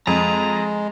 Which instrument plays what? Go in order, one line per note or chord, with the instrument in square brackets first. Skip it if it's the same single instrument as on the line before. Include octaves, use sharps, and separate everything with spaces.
[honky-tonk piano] F2 [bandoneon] G#3 [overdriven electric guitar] A#5